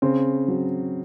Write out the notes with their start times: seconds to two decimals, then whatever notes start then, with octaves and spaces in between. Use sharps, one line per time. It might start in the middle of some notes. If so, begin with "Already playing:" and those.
0.02 C#3 C4
0.48 F#3